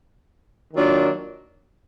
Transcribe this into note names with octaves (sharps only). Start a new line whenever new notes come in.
D#3 F#3 A#3 D4 F4